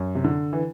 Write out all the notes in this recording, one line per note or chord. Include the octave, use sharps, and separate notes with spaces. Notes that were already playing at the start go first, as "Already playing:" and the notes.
Already playing: F#2
C3
D3
E3